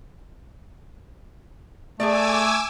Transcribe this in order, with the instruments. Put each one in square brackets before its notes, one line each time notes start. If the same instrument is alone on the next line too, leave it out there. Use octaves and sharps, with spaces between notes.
[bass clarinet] A3 [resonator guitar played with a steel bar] G#4 A4 D5 [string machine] G#5 D6 E6